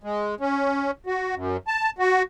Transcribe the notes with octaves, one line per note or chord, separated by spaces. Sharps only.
G#3
C#4
F#4
F#2
A5
F#4